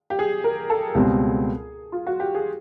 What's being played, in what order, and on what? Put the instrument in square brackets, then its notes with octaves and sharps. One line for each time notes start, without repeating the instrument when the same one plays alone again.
[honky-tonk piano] G4
G#4
A#4
A4
[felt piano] C#2 B2 G3 C4 [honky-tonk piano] G#4
[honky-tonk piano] F4
F#4
G4
G#4